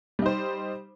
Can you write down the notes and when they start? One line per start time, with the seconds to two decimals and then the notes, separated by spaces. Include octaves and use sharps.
0.19 G3
0.22 D#4
0.26 C5